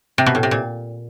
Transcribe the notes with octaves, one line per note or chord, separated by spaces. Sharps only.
C3
B2
A2
C3
A#2